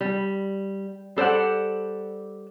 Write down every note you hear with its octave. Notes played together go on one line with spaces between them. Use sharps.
G3
G3 A4 C5 D5 F#5